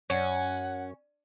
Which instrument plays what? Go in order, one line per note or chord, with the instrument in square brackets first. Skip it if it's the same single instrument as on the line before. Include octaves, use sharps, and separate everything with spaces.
[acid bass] F#2 [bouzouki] C#4 [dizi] F#5